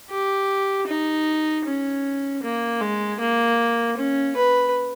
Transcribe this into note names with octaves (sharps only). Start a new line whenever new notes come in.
G4
D#4
C#4
A#3
G#3
A#3
C#4
B4